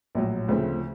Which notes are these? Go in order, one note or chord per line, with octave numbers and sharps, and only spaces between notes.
A#1 A2 F#3
D2 C#3 F3 A3 C4